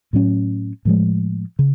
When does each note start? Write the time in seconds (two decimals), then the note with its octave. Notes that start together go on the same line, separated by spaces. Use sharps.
0.13 A2 F#3 C#4
0.85 A2 F3 G#3
1.59 C#3